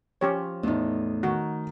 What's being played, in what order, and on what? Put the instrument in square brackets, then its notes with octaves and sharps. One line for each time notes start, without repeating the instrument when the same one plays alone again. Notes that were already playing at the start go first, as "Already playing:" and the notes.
[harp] F3 [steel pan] C#4 G4 C#5
[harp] E2 A2 [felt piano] A3 D#4
[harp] D#3 [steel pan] F#4